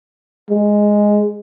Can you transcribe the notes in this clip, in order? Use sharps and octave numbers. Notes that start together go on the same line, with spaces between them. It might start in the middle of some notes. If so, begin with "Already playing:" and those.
G#3